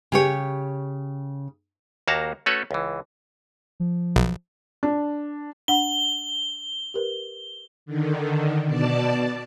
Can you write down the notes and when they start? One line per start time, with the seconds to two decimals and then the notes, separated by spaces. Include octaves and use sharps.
0.12 C#3 G4 C#5
2.08 D#2 A#3 F#4 A5 A#5
2.46 A3 C#4 F#4 A4 B4 C#5
2.71 C#2 E3
3.80 F3
4.16 B1
4.83 D4
5.68 D4 F#5 G7
6.94 G4 A#4 B4
7.86 D3 D#3
8.66 B2 D5 A5